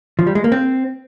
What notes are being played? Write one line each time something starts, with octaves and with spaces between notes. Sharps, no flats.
F3
G3
G#3
A#3
C4